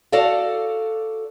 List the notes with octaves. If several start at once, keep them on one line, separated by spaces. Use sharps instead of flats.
F#4 A4 D5 F5